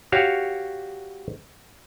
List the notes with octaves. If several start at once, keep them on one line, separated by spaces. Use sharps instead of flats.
F#4 G4 C#5 F5